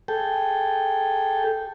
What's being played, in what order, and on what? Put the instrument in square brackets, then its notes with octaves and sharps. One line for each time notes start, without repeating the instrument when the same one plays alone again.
[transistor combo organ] G#4 A4 G5